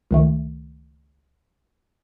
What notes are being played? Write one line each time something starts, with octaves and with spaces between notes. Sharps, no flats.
C#2 D#3 A3